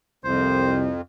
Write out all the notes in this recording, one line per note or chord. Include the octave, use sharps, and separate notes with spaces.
C2 F2 C5